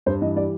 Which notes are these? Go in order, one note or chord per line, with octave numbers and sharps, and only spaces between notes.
G2 C5
E3 D#5
G3 D5